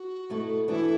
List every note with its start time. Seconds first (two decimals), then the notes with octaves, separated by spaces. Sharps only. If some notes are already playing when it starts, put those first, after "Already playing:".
Already playing: F#4
0.29 B2 A3 E4 A4
0.68 E3 B3 D4 E4 A4